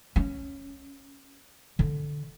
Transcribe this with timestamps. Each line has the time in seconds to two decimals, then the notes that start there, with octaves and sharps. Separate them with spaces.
0.16 C#4
1.79 D3